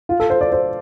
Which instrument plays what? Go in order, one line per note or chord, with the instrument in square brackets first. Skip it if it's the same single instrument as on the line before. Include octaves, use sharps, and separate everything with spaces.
[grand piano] F4
A4
C5
D5
C5